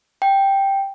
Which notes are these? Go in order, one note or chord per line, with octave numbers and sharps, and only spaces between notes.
G5